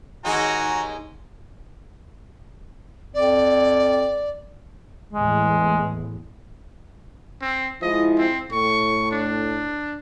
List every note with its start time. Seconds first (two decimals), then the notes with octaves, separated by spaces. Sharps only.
0.25 D#2 G#3 D#4 F#4 G#5 A#5
3.14 F2 D5
5.13 E2 A2 G#3
7.41 C4
7.82 F3 G#3 E4 D#5
8.18 C4
8.52 A2 C#6
9.11 D4